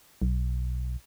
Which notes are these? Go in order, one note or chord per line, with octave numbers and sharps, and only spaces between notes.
B1